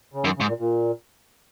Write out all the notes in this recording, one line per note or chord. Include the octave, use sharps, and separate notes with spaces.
C#3
F#2 D#3
C#3
G#2
A#2
A#2